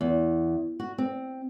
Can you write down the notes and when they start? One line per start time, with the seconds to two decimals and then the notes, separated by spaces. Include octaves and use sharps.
0.01 E2
0.80 F#4
0.98 C4